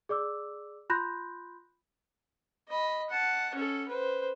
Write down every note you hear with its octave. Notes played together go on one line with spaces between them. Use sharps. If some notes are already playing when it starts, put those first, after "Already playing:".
G#4 D5 D6 E6
F4 B5 C6 F#6 G6 A#6
D#5 B5
F#5 A5
C#4 A4
B4 C5